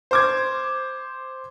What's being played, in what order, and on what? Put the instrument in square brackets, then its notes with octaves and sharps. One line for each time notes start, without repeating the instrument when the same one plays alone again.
[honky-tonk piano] C5 D6 G#6